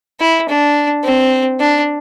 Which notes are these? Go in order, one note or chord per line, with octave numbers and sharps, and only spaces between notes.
E4
D4
C4
D4